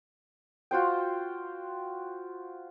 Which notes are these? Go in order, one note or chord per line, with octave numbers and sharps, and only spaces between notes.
F4 F#4 C5 G5